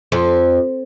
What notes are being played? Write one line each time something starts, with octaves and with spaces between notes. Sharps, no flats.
F2